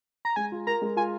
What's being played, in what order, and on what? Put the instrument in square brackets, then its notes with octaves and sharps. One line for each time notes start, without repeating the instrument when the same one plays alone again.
[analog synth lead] A#5
[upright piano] G#3 [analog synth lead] G#5
[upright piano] F4
[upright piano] A#4 [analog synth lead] A#5
[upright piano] G#3
[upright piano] F4 [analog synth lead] G#5